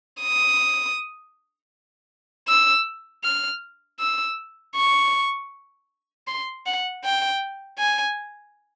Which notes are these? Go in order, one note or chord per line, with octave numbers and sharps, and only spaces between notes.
D#6
E6
F6
E6
C#6
C6
F#5
G5
G#5